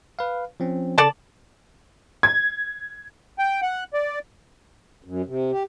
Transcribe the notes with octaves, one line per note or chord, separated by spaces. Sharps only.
B4 F5
F3 C4 C#4
C#3 A4 D5 A5
G#6
G5
F#5
D5
F#2
C3
G4